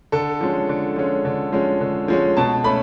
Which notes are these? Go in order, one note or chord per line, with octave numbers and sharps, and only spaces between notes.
D3 A4
F3 G#3 C#4
D3
F3 G#3 C#4
D3
F3 G#3 C#4
D3
F3 G#3 C#4
B2 A5
A3 C#4 B5